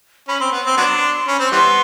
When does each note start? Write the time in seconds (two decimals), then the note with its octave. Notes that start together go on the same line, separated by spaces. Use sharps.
0.28 C#4 B5
0.40 C4 C6
0.52 B3
0.66 C4
0.77 F#3 B3 D4
1.27 C#4 B5
1.39 C4
1.46 C6
1.52 E3 G3 B3